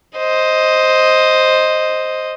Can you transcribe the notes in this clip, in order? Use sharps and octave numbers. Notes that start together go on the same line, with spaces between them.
C5 D#5